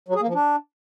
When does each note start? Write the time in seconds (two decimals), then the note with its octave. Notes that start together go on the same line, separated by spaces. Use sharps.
0.08 F#3
0.15 G#4
0.21 A#3
0.28 F3
0.34 D4